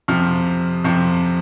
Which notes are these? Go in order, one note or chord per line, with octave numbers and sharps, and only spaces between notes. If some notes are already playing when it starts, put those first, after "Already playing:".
F2 C3 F3 F6
F2 C3 F3